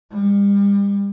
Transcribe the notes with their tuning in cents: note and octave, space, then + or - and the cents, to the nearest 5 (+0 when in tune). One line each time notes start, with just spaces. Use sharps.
G3 +40